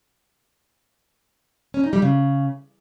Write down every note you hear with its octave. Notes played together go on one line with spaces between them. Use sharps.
C#4
D#4
G3
C#3